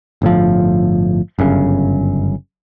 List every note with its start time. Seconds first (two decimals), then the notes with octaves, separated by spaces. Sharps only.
0.22 G1 A2 F3
1.39 G1 F#2 C#3